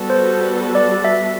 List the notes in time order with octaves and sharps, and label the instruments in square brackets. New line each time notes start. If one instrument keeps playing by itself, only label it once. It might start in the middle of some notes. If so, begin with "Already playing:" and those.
Already playing: [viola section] G3 B3 F#4 A4
[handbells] C5
D5
E5